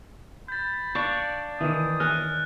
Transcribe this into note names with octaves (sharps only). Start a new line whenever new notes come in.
B5 G6 A6
D4 D5 F5 C#6
D#3 E3 D#6
C#5 D#5 G#5 F6 F#6